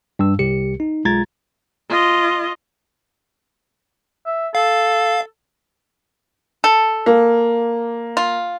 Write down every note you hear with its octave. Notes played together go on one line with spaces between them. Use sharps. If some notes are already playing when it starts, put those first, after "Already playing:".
G2 E6
C2 G4 C#7
D#4
B1 G#3 F4 A#5 G#6 A6
F4 D#5
E5
A4 F5
A4
A#3
F4